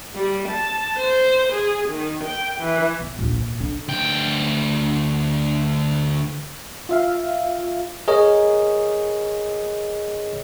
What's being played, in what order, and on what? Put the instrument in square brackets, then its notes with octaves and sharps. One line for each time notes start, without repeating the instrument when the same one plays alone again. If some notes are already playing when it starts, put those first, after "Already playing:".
[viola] G3
A5
C5
G#4
D#3
G5
E3
[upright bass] B2
A#1 D#2
A#2
D3
[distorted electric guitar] D2 G5
[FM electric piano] F4 E5 F5
[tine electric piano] G#4 A#4 C#5 D#5